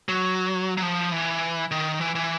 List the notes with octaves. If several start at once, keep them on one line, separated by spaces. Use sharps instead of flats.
F#3
F#3
F3
E3
D#3
E3
E3